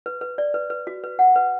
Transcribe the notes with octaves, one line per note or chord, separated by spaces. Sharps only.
B4
B4
D5
B4
B4
F#4
B4
F#5
B4